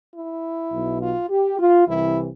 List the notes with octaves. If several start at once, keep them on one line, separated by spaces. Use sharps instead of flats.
E4
B1 B2
F4
G4
F4
C2 C3 E3 E4